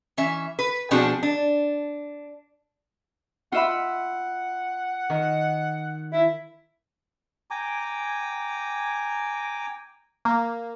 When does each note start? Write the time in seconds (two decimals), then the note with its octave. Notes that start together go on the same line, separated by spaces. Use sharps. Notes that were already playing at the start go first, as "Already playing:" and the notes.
0.17 E3 C#4 E5
0.59 B4
0.91 B2 F3 C4 D4 F#4 G#4
1.23 D4
3.52 F4 E5 F#5 B5
5.10 D#3
6.13 E4
7.51 G5 G#5 A#5 D6
10.25 A#3